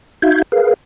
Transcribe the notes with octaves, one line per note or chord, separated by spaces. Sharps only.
D#4 F#4 E5 F5 G6 G#6
G#4 A#4 B4 F5